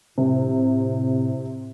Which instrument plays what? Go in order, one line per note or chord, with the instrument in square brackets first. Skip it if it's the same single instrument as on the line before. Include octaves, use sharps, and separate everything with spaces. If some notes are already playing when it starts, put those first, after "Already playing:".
[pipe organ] A2 [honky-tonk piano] C3